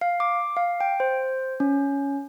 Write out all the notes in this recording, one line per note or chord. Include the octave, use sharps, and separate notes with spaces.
F5
D6
F5
G5
C5
C#4